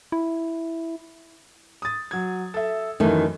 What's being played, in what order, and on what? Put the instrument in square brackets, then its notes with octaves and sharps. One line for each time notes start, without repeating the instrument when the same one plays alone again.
[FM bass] E4
[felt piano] D#6 A6
F#3 G#6
A4 E5
[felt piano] F#2 E3 [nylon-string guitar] D#3 A3